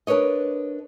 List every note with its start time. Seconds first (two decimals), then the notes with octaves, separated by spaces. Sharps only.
0.07 D4 A#4 B4 C#5 D#5